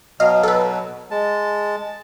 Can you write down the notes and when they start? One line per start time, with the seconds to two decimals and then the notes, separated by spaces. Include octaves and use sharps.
0.20 B2 F#3 D#5 F5
0.43 A4 B4
1.11 G#3 A5